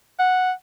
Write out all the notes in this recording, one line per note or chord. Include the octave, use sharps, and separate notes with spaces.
F#5